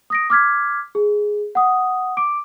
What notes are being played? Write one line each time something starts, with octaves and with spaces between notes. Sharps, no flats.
D#6 A#6 D7
D6 F6 G#6 B6
G#4
F#5 D#6
D6 D7